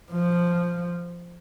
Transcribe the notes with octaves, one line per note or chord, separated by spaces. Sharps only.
F3